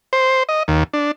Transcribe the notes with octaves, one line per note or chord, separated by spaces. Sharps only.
C5
D#5
D#2
D4